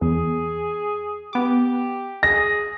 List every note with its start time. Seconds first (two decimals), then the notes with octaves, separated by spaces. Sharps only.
0.01 E2 G#4
1.33 B3 G4 D6
2.23 G#4 A#6